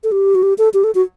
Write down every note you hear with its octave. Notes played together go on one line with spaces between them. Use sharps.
A4
G4
F#4
G4
A4
G4
A4
F#4